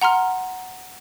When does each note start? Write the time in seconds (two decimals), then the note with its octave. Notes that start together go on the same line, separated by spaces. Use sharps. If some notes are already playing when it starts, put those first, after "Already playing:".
0.01 F#5 A#5 C6 F6